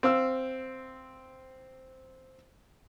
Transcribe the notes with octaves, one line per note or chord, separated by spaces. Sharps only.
C4 F5 E6